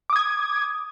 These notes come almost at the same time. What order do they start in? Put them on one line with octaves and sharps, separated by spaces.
D6 D#6 G#6